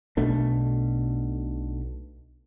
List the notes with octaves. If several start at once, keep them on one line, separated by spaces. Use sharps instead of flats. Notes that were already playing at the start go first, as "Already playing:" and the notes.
B1 B2 A3 D4